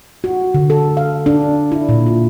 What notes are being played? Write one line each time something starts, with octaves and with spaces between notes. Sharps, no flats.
F#4
D3
A4
F5
D4
E4
A#2
F4